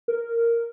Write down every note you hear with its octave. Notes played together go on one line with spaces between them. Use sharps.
A#4